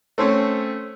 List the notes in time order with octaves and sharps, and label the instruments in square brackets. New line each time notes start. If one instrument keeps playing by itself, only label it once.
[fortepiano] A3 C4 C#4